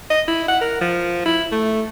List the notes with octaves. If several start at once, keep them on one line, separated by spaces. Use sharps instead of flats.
D#5
E4
F#5
A#4
F3
E4
A3